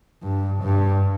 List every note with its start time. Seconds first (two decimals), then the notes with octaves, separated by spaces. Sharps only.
0.23 G2
0.62 G2